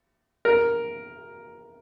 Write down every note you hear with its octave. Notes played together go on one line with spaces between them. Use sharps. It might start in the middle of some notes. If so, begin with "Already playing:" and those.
A#4